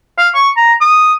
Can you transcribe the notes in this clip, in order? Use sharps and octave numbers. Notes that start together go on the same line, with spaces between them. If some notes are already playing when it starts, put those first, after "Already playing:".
F5
C#6
A#5
D#6